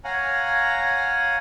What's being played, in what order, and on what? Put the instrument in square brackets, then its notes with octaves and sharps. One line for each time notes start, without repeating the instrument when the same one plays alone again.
[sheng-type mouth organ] C#5 F5 F#5 G#5 A#5